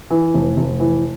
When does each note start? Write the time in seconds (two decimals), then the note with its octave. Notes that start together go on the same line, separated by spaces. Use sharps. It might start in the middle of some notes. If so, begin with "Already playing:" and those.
0.10 E3
0.34 F1
0.57 F1
0.80 E3